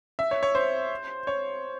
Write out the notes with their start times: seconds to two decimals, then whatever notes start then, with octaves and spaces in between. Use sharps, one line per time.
0.19 E5
0.31 C#5
0.43 C#5
0.55 C5
1.27 C#5